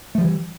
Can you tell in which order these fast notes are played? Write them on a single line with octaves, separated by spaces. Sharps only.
A3 F3 G3 E3